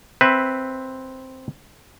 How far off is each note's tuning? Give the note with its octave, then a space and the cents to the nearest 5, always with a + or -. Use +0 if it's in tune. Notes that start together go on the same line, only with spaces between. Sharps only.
C4 +0 B4 +0 E5 +10